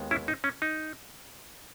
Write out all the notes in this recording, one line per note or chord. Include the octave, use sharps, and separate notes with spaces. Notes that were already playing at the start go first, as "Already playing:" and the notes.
Already playing: D#2 D#3 G#3 B3
C#4 E4
D#4
C#4
D#4